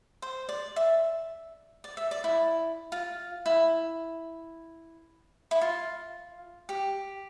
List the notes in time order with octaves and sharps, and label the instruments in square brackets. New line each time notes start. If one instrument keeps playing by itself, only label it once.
[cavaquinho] C5
D5
E5
D5
E5
D5
E4
F4
E4
E4
F4
G4